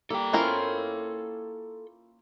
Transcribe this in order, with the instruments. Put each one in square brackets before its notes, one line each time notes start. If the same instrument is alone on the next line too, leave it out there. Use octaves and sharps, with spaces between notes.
[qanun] G3 A#3 [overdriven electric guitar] A4 G5
[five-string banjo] A#3 C#4 A#4 [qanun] E4 F4 C5